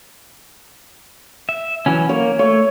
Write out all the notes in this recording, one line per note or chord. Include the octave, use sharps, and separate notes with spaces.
E5
E3 F#3 C#4
A#3 C#5
A3 C#5